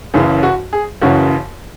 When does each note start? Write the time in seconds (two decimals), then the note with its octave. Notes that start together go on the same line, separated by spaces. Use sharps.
0.14 F#1 F#2 C#3 E3 G#4
0.43 F#4
0.73 G#4
1.01 F#1 F#2 C#3 E3 F#4